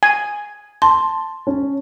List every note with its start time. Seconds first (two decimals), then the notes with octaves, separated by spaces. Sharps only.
0.03 G#5
0.82 A5 C6
1.47 C#4